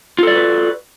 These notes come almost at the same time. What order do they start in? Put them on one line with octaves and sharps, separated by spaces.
F4 A4 D5 F#4 B4